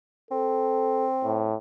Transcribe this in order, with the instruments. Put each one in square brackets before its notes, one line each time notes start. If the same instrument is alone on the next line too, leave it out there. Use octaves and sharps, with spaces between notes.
[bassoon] C4 [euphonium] A4
[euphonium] A2